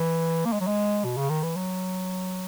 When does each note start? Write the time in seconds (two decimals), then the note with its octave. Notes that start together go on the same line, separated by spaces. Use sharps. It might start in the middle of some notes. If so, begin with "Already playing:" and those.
Already playing: E3
0.45 A#3
0.52 G#3
0.61 F#3
0.67 G#3
1.05 B2
1.17 C#3
1.30 D#3
1.43 E3
1.56 F#3